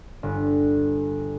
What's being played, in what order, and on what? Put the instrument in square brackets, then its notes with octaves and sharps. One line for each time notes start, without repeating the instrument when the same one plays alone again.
[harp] G1